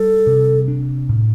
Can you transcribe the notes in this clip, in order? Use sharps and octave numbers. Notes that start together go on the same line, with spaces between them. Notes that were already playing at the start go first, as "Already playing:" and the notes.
Already playing: G3 A4
C3
D4
A2